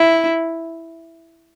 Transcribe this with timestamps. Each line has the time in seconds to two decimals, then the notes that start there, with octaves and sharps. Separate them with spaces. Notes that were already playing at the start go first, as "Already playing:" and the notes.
Already playing: E4